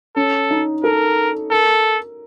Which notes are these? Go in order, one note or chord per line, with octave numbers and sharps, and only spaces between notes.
C#4 A4
D#4
A4 A#4
A4 A#4